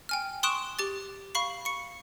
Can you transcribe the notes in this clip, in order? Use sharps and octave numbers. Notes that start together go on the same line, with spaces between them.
G5 G#5 F6
C6 C#6 D#6 F#6 D7 E7
G4 D6 A6
F5 B5 C#6 C7
C#6 C#7